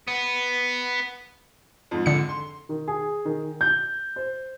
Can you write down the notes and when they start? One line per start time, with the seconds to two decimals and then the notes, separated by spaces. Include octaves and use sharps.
0.08 B3
1.91 F2 G#2
2.06 D3 C#7
2.29 C6
2.69 D#3
2.88 G#4
3.25 D#3
3.61 G6
4.16 C5